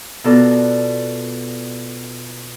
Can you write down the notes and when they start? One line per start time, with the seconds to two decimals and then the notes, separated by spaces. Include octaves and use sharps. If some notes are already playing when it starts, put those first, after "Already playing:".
0.24 B2 B3 F4 A4 A#4 D5